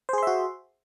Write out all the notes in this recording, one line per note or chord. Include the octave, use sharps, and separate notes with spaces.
F#4 G#4 C5 E5 C6